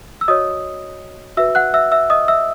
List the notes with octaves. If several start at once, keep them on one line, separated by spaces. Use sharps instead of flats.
E6
F#4 C#5 D#5 D#6
F#4 B4 E5 E6
F#5 F#6
E5 E6
E5 E6
D#5 D#6
E5 E6